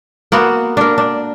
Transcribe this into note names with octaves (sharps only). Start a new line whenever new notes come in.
A#3 B3 F#4
D4 A#4
D4